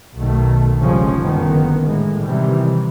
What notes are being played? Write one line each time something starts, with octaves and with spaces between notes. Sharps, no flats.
B1 B2 D#3 A3
F1 C#3 F3 G3 G#3 C#4
F#1 D3 D#3 B3
A2 G#3
C3 D#3 E3 G3